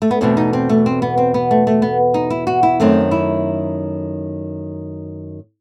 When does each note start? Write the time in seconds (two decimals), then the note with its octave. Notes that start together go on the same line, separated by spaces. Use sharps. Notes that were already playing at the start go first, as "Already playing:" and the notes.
0.02 A3
0.11 B3
0.21 E2 B2 A3 C4
0.37 D#4
0.53 C4
0.69 A3
0.86 C4
1.02 B3
1.18 C4
1.34 B3
1.51 A3
1.67 A3
1.82 B3
2.14 D#4
2.30 E4
2.47 F#4
2.63 E4
2.80 F#2 D#3 A3 C4
3.11 E4